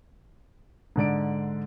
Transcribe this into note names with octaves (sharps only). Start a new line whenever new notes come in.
G#2 D3 D5 D7